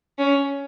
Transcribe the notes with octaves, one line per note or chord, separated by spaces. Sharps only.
C#4